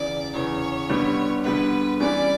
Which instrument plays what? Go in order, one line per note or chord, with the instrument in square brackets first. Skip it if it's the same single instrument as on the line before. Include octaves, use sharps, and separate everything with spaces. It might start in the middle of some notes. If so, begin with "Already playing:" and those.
Already playing: [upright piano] E2 C#3 E3 [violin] D5
[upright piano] E2 C#3 E3 [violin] C#5
[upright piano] D3 G3 B3
[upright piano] D3 G3 B3 [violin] B4
[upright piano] E3 G3 C#4 G4 B4 [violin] D5